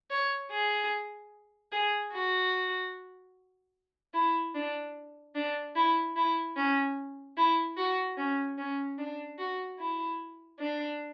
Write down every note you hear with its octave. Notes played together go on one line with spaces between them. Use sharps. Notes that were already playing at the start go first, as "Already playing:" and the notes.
C#5
G#4
G#4
F#4
E4
D4
D4
E4
E4
C#4
E4
F#4
C#4
C#4
D4
F#4
E4
D4